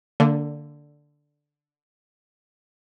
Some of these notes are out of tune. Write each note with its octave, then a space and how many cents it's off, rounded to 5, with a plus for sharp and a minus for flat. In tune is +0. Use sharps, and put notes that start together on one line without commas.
D3 +0 A#3 -35 D4 -15